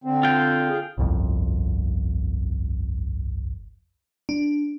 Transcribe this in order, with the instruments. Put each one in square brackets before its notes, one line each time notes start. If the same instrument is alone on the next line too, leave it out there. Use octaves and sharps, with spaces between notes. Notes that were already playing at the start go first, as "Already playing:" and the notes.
[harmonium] D3 C4
[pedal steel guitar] F4 G5
[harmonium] G#4
[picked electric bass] G1 C2 F2
[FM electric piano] D4